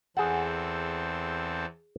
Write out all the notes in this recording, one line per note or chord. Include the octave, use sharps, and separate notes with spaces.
E2 C4 G#4 A4 F#5